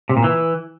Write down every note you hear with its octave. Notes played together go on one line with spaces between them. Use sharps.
C3
A#2
E3